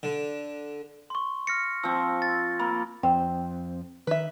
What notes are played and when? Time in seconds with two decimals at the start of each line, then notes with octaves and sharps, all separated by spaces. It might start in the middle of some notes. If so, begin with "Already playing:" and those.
0.03 D3
1.10 C6 C#6
1.47 F6 A#6 C#7
1.83 F3 C4 E6
2.22 A6
2.60 A#3 B5
3.03 F2 C4 C5 G5
4.07 D#3 B4 E5